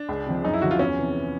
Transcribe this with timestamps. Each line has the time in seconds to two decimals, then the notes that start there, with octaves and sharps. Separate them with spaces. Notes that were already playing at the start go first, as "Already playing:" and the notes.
Already playing: D4
0.09 C#2
0.26 C3 F3
0.44 F#2 D#4
0.53 E4
0.62 D3 F3 F#4
0.71 F4
0.79 E2 C#4
0.97 C3 E3